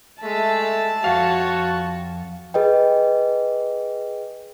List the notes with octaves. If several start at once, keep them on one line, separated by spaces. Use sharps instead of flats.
G#3 A3 E5 A5
F2 F#4 C#5 F5
G#4 B4 D#5 G5